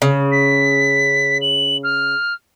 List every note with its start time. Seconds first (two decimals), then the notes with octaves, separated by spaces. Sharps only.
0.02 C#3
0.31 B6
1.41 F#7
1.83 F6